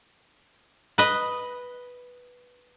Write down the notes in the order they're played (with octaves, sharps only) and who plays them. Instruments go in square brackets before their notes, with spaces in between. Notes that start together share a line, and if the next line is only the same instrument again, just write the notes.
[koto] B4 D#5